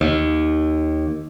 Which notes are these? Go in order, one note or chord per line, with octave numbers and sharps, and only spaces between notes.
D#2